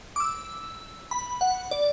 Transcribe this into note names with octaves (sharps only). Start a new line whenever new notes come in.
D6
E6
B5
F#5
D5